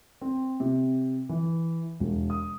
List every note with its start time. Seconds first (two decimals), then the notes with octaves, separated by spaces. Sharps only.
0.21 C4
0.60 C3
1.29 E3
2.00 E1
2.30 D#6